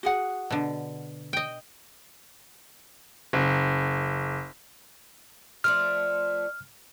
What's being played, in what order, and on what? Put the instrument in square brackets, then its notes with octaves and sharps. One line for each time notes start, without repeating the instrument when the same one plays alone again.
[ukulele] F#4 G#4 F#5
[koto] B2 D3
D#5 G5
[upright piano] F#1
[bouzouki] F3 A3 D5 [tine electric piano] F6